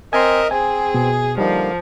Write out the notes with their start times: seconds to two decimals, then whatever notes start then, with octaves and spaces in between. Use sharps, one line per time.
0.13 C4 A#4 D#5 E5 G#5 C6
0.51 C4 G#4 G#5
0.94 B2
1.38 D3 F3 G3 A#3 D#4